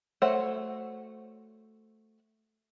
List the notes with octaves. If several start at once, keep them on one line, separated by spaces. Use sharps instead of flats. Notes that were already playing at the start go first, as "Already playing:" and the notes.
A3 F#4 C5 C#5 F#5